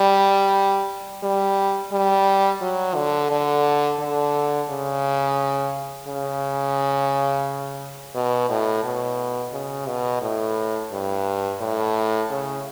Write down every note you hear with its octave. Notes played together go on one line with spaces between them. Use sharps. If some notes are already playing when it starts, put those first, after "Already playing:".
Already playing: G3
G3
G3
F#3
D3
D3
D3
C#3
C#3
B2
A2
B2
C#3
B2
A2
G2
A2
C#3